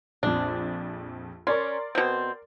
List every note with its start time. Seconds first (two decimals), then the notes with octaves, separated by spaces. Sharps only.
0.23 A#1 F2 D4
1.47 C#4 A#4 D5 C6
1.95 B2 C4